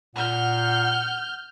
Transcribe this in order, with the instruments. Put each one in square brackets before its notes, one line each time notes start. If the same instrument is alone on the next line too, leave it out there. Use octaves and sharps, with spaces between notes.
[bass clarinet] A#2 [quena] F#5 [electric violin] F6 G6